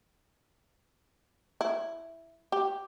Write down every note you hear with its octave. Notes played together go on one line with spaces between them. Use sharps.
E4
G4